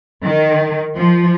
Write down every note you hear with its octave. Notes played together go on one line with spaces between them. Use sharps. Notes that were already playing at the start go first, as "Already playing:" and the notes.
D#3
F3